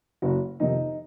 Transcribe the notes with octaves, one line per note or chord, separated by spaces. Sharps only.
F#1 F#4
F2 C3 D#3 D#4